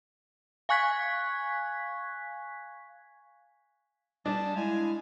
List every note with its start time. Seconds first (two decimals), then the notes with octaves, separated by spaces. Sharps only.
0.69 F5 G#5 C#6 F#6 G#6 B6
4.26 G3 D4 D#5 G#5 A5
4.56 G#3 D#4 E4 F5 G#5